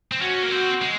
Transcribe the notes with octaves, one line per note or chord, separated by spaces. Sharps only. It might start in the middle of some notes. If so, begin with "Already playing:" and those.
C4
C#4 F#4
A#3
C4 F#4
G#3